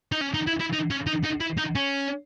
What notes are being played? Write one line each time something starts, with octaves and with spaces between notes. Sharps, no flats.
D#4
C#4
D#4
E4
E4
D#4
C#4
D#4
D#4
E4
D#4
C#4